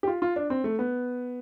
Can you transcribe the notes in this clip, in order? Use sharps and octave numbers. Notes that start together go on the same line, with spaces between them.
G4
F4
F4
D4
C4
A3
B3